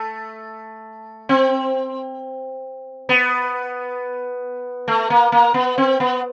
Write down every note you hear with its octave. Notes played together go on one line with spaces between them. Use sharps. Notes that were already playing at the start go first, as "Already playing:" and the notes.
Already playing: A3
C4
B3
A3
A#3
A#3
B3
C4
B3